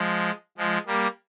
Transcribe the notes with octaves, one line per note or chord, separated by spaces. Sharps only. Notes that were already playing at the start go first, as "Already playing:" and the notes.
Already playing: F3 G#3
F3 G#3
G3 A#3